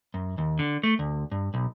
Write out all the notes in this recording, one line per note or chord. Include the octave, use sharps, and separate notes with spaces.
F#2
D#2
D3
A3
D2
G2
B1